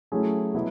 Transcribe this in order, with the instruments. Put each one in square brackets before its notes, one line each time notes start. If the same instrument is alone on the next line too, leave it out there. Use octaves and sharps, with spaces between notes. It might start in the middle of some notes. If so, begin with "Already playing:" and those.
[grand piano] F#3 A3 C#4 E4 G#4
B2 F#3 B3 E4